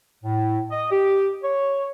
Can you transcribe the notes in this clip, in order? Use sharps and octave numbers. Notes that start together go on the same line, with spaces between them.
A2
D#5
G4
C#5